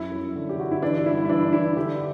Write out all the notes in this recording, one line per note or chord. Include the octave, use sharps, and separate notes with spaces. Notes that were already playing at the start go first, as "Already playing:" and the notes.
Already playing: F#2 E4
F#2
D3
G4
D3 F#4
E4
E3 D4
G2 E4
E4
E3 D4
E3 E4
D3 G4